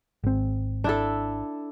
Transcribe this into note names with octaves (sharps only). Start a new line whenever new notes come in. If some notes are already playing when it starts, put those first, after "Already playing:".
G#1 C4
D4 E4 A4